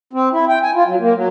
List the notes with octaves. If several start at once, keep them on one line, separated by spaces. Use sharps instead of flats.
C4
E4
G5
G#5
F4
F#3
A#3
F#3